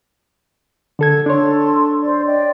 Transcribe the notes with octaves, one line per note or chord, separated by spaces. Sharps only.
D3 A4 G#6
D4 A4 C#5 C6
C5 D5 C6
D5 D#5 G5